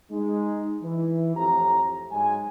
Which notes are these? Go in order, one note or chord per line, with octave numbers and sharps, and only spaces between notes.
G#3 D#4
E3
F2 A2 F3 G4 A#5
G#2 F#3 G#3 G#5